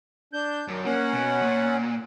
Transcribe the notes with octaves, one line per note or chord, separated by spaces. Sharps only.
D4 G6
F#2 D#3
A#3 C#4 F#5
B2
A#2